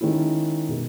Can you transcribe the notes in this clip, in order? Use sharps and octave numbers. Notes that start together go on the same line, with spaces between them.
D#3 G#3 C#4 E4
B2 G#3